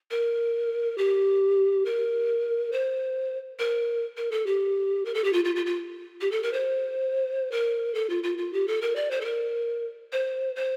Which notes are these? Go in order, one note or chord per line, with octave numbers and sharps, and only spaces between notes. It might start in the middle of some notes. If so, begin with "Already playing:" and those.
A#4
G4
A#4
C5
A#4
A#4
A4
G4
A#4
A4
G4
F4
F4
F4
F4
G4
A4
A#4
C5
A#4
A4
F4
F4
F4
G4
A4
A#4
D5
C5
A4
A#4
C5
C5